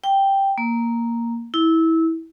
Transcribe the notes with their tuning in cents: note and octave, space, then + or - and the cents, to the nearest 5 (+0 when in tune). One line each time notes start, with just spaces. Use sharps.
G5 +0
A#3 +0
E4 -20